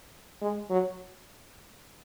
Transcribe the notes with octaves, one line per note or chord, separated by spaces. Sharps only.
G#3
F#3